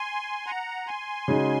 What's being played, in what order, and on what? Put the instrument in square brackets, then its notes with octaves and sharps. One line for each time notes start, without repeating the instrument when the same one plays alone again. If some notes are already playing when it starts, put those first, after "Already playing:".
Already playing: [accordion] G#5 C6
F#5 A#5
G#5 C6
[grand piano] C#3 G#3 D#4 F#4